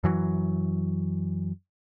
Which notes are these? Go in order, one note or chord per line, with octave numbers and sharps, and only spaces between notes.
F#2 E3 F#3